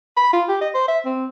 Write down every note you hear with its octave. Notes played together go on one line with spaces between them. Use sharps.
B5
F4
G4
D#5
C5
E5
C4